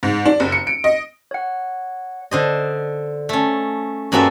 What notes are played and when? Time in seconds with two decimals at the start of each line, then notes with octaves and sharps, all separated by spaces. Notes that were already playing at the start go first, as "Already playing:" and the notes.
0.03 G#2
0.26 D4
0.40 F#1
0.52 C#7
0.67 D7
0.84 D#5
1.31 C#5 F#5
2.31 D3 C5 D#5
3.29 A3 C#4
4.12 G2 A#3 C#4 F#4 A4 E5